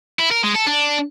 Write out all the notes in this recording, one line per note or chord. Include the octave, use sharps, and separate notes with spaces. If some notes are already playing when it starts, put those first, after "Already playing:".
E4
A#4
G#3
A4
D4